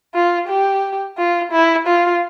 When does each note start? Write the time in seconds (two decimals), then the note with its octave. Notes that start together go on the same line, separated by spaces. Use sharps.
0.14 F4
0.48 G4
1.18 F4
1.52 E4
1.87 F4